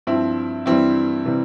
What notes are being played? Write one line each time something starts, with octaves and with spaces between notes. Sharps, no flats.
G2 F3 C4 E4
G2 E3 G3 C4 E4
C3 E3 G3